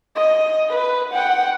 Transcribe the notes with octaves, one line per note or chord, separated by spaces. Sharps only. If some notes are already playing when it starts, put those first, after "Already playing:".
D#5
B4
F#5 G5